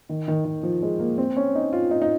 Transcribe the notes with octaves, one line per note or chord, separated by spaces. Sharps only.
D#3
D#3
D#3
F3
G#3
A#3
C4
C#4
D#4
F4
D#4
D#4